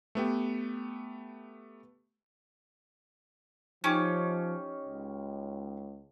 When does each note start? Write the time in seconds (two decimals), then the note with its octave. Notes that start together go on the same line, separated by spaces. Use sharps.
0.15 A3 B3 G4
3.84 F3 C#4 D#4 G4
4.85 C#2